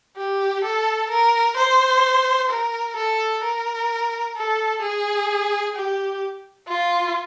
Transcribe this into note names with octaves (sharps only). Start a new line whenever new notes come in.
G4
A4
A#4
C5
A#4
A4
A#4
A4
G#4
G4
F4